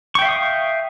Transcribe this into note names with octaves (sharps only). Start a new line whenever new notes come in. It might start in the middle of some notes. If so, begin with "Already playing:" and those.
E5 F5 G5 C#6 D#6